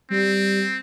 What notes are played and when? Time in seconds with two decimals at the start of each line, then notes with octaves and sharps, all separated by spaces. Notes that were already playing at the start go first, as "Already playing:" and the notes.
0.10 G3 C4